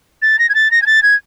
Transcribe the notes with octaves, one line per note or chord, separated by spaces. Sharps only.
A6
A#6
G#6
A6
A#6
G#6
A6
G#6